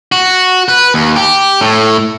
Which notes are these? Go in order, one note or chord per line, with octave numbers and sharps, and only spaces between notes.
F#4
B4
D#2
G4
A2